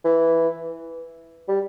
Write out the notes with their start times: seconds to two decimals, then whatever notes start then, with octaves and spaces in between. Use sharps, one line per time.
0.05 E3
1.49 G3